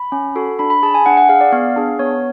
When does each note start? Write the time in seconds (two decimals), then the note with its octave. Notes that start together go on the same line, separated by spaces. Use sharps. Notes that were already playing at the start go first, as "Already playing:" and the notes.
Already playing: B5
0.12 C#4
0.36 F#4 A4
0.59 D4 B5
0.70 B5
0.83 G#4 A5
0.94 G#5
1.06 D4 F#5
1.17 F#5
1.29 G#4 F5
1.41 D5
1.52 B3 F5
1.76 D4 G#4
1.99 B3 C#5